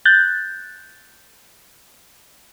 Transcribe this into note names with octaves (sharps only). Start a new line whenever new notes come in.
F#6 G6 A6